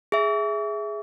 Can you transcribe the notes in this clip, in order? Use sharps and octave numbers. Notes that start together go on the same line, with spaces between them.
G#4 E5